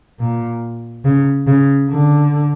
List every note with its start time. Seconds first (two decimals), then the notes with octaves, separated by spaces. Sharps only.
0.20 A#2
1.05 C#3
1.47 C#3
1.89 D3